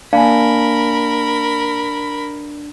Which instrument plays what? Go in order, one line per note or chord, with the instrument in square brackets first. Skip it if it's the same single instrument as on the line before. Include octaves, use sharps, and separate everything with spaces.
[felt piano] A#3 [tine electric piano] D4 [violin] A#4 B5 [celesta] F5 G#5